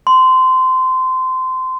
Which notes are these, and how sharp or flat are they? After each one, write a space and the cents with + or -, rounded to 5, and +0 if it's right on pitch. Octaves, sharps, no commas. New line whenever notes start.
C6 -20